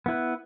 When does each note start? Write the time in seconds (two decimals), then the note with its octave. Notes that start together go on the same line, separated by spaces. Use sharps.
0.06 B3 E4 B4